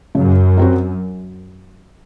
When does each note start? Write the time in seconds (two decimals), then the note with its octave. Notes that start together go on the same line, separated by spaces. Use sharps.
0.15 F#2 C#3
0.57 F#3 C4 F#4